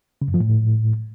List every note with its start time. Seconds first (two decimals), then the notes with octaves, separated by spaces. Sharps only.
0.22 C#3
0.28 F#2
0.34 F3
0.40 A2